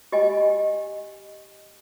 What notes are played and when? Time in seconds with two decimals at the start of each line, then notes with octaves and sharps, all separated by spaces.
0.12 G4 D#5 G#5